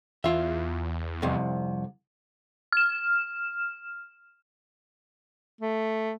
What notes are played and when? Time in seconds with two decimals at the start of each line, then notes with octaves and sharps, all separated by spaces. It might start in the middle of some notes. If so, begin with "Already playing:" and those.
0.24 E2 F4 E5
1.22 C2 F2 C3
2.72 F6 E7
5.61 A3